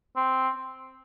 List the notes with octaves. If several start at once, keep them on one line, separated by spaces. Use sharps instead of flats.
C4